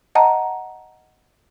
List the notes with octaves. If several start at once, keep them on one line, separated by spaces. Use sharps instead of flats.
D#5 F#5 A5 A#5